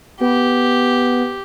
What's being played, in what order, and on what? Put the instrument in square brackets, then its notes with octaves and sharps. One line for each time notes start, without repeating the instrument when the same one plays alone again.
[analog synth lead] B3 [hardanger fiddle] G4